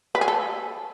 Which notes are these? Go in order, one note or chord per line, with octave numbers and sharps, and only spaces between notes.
B4
G#4
A4